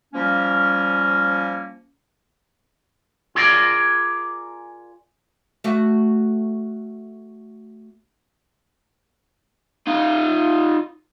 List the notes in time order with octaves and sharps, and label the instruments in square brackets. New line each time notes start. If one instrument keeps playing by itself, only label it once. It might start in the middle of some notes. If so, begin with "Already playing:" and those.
[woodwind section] F3 G3 A#3 C#4
[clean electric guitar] F4 G#4 A#4 D5
[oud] A3 F#4 E5
[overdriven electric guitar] D#4 F4